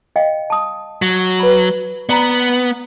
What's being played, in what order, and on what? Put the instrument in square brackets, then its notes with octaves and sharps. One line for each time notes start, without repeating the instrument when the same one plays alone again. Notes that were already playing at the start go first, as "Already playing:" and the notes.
[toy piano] D#5 F5 G5
A5 D#6
[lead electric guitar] F#3
[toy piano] B4 B5
[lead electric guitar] B3 [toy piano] D5 A#5 B5